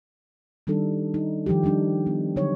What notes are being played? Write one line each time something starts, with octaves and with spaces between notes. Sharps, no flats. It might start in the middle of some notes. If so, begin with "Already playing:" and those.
D#3 G3 D4 D#4 A4
D#4
D#3 F3 G3 G4
F3 G3 D4 D#4
B3
D3 F#3 D#4 C#5